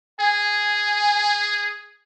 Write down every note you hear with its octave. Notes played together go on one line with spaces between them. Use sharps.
G#4 G#5